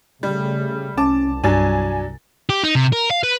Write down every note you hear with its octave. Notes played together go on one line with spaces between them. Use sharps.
C#3 G3 A3
C2 C#4 A5 D6
G2 F#3 D4 G#5 A6
G4
D#4
C3
A#4
F5
B4